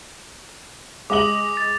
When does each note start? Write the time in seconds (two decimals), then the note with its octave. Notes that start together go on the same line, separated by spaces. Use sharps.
1.10 G#3 D#5 D6 F#7
1.57 A6